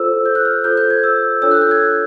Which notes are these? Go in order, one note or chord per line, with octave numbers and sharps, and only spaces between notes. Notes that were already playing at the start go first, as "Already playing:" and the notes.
Already playing: F4 A4 C5 E6
G6
F#6
F6
F4 A4 C5 G6
G6
G#6
E6
D4 F4 A4 C#5 E6
F#6
G6
G#6